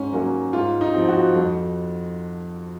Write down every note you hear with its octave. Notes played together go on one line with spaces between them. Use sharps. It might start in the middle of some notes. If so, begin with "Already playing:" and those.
Already playing: G#2 C#4
F#3 A#3 C#4
G#2 F4
D#4
F3 C4
F#4
F2